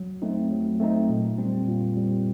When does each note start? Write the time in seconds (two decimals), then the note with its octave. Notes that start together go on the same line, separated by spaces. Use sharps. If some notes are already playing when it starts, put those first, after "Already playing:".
Already playing: F#3
0.22 A3 C4 D#4
0.51 F#3
0.80 A3 C4 D#4
1.09 A#2
1.38 G3 C4
1.68 A#2
1.97 G3 C4